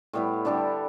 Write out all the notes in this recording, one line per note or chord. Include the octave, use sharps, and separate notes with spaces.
A2 G3 B3 E4
D3 G3 D4 A4